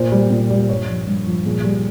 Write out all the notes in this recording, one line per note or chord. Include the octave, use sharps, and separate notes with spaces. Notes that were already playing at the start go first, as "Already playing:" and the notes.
Already playing: A#2 C5
G3
A#2
G3
G2 C#5
F3
G2
F3
A#2 G#4
G3